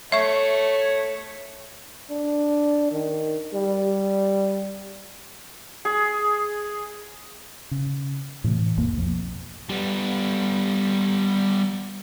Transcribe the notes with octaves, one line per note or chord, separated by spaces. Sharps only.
A3 C#5 E5 C#6
D4
D#3
G3
G#4
C#3
A2 C3 E3 A3
G#1 E2 A#3
B1 F2
G3 B3